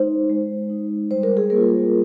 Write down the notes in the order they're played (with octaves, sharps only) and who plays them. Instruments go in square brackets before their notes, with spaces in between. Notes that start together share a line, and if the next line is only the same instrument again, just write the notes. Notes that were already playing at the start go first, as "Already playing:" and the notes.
Already playing: [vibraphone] G#3 D#4 C5
G#3
D#4
G3 C5
A#4
G#4
A#3 A#4
F4